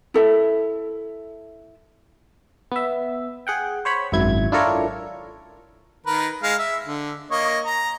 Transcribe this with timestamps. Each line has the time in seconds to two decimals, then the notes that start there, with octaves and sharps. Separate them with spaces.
0.14 E4 A4 E5
2.72 B3 E5
3.47 G#4 F#5 G5
3.85 C5 C#5 B5
4.12 G#1 F#2 E4 G#6
4.52 D4 E4 F4 A4 A#4 C#5
6.06 D#3 A#4 B4
6.43 G#3 F5
6.59 E5
6.87 D3
7.31 A#3 C#5 D#5
7.65 A#5